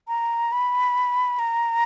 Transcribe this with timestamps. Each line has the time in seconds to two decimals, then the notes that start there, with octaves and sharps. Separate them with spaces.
0.08 A#5
0.52 B5
1.39 A#5